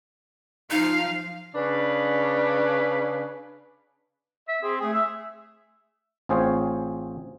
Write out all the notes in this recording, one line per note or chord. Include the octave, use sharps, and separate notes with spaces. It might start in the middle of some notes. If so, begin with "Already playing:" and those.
F3 D#4 F5
C#3 D4 B4
E5
C4 G#4
A3 G#4
E5
A1 C4 F4 G#4 C5 C#5